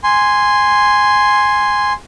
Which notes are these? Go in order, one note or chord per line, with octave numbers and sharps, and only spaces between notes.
G#5 C6